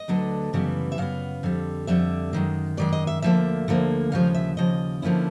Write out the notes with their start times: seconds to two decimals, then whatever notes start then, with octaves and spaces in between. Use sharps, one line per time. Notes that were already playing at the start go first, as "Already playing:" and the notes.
Already playing: D#5
0.08 D2 D3 F#3 B3 D4
0.53 F#2 C#3 E3 G3 B3
0.92 E5
0.98 F#2 C#3 B3 F5
1.43 F2 D3 G3
1.87 F2 D3 G3 E5
2.33 F#2 D#3 G#3
2.77 F#2 D#3 G#3 D5
2.93 D#5
3.07 E5
3.22 D2 D3 F3 A#3 E5
3.68 D2 D3 F3 A#3
4.12 D#2 C#3 F3 G#3 F5
4.35 E5
4.57 D#2 C#3 F3 D#5
5.02 D3 F3 A#3 C#4 E4